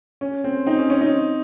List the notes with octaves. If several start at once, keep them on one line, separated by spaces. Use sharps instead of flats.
C#4
C4
C4 D#4
C#4
C#4
C4 D#4